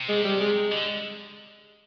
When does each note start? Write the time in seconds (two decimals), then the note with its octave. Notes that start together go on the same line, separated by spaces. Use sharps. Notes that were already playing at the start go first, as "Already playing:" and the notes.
Already playing: C3
0.09 G#3
0.24 G3
0.40 G#3
0.72 D3